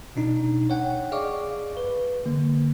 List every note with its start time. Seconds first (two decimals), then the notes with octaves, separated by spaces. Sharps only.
0.16 B2 D4 D#4
0.70 C#5 F#5 G5
1.12 G#4 D5 D#5 F5 C#6 D6
1.77 B4
2.26 D3 A#3